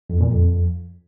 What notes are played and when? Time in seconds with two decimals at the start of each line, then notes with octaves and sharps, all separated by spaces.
0.10 F2
0.21 A#2
0.32 F2